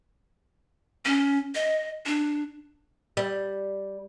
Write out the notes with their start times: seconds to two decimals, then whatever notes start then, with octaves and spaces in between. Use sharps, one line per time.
1.06 C#4
1.55 D#5
2.06 D4
3.17 G3